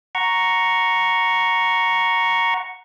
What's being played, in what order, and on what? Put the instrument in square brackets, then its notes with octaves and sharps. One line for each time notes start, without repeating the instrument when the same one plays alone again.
[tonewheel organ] F#5 A#5 C#6